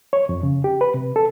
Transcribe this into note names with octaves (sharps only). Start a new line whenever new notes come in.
C#5
F2
C#3
G4
B4
C3
A4